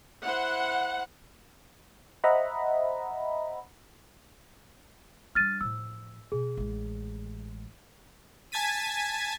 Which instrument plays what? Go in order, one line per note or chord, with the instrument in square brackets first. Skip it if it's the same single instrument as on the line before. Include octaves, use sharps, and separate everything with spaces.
[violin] E4 C5 [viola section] F#5
[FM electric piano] C5 D#5 E5 F#5 A#5 B5
[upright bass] G3 D4 [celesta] F6 A6 D#7
[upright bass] A2 F3 [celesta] E6
[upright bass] B2 [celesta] G#4
[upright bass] A1 G#3
[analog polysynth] G#5 A5 G#6 A6 B6 D#7